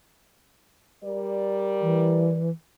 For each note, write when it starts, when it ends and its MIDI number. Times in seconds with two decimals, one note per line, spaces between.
1.03 2.44 55
1.03 2.44 70
1.03 2.44 74
1.81 2.50 52